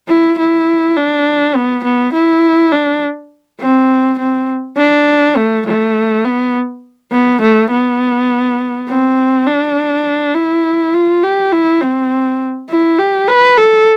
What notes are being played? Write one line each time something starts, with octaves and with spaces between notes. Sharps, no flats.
E4
E4
D4
B3
B3
E4
D4
C4
C4
D4
A3
A3
B3
B3
A3
B3
C4
D4
E4
F4
G4
E4
C4
E4
G4
B4
A4